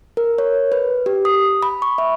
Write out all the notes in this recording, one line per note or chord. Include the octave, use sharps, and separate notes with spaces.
A#4
C#5
B4
G4
D#6
B5
C#6
E5